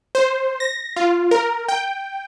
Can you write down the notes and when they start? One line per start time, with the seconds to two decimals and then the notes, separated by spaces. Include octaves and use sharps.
0.15 C5
0.60 A#6
0.96 F4
1.31 A#4
1.68 G5